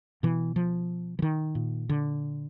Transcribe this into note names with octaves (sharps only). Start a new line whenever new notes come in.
B2 E3
F3
E3
D#3
A#2
D3